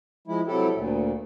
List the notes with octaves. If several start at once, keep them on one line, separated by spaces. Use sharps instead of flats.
F3 G#3 E4
C3 F#3 G3 E4 G4 A4
D2 A#2